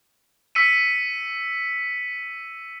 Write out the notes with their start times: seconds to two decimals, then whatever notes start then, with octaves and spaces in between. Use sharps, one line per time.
0.55 E6 B6 C#7 D#7